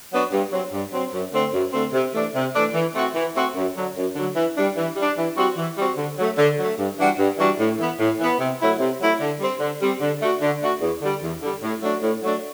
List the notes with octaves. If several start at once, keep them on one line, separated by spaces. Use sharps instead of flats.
F#3 B3 D4 F#4
G2
F#3 C4
G2
F#3 C4
F#2
D3 A3 C4
F#2
D3 A3 C4
C3
E3 A3 D4
C3
E3 A3 D4
E3
A3 C4 F#4
E3
A3 C4 F#4
F#2
D3 F#3
F#2
D3 F#3
E3
G3 D4
E3
G3 D4
E3
G3 C4 F#4
E3
G3 C4 F#4
D3
F#3 A3
D3
F#3 A3
G2
E3 G3 D4 F#4
G2
E3 G3 D4 F#4
A2
E3 B3
A2
E3 B3
C3
F#3 A3 E4
C3
F#3 A3 E4
D3
G3 C4
D3
G3 C4
D3
A3 D4 F#4
D3
A3 D4 F#4
E2
D3 G3
E2
D3 G3
A2
F#3 A3 D4 F#4
A2
F#3 A3 D4 F#4